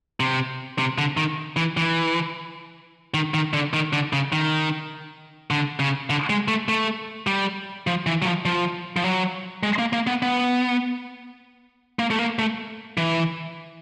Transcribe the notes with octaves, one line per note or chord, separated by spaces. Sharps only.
C3
C3
D3
D#3
E3
E3
D#3
D#3
D3
D#3
D3
C#3
D#3
D3
C#3
D3
G#3
A3
A3
G3
F3
E3
F#3
F3
F3
F3
F#3
G#3
A#3
A#3
B3
B3
A#3
A3
A#3
A3
E3